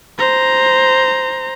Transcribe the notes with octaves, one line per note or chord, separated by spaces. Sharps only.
C5 A#5